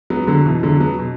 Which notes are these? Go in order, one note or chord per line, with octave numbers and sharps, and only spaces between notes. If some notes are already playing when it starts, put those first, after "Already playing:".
F#3 B3
D3 F#3
B2 E3
D3 F#3
F#3 B3
B2